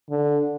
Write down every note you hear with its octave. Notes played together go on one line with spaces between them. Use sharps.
D3